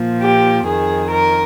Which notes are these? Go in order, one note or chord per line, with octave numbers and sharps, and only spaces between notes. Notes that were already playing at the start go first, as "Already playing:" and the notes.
Already playing: A#2 F3
G4
F2 D#3 G#4
A#4